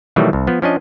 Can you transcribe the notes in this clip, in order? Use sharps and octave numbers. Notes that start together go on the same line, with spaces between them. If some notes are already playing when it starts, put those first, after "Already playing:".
B2 D#3 E3 F#3 G3 A3
C2
F3 B3
F3 C#4 D4 D#5